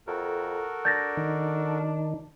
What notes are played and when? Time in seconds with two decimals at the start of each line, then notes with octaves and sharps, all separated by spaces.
0.07 F2 F#4 A4 A#4
0.85 D4 G6 A6 A#6
1.17 D#3